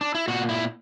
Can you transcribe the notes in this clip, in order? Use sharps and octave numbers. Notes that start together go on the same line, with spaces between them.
D4
E4
A#2 F#4
E4